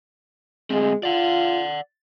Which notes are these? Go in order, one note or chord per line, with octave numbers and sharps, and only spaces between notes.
D2 G#3 C4
F4 D5 F#5